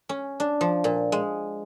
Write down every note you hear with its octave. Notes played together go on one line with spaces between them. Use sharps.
C#4
D4
F3
A#2
G#3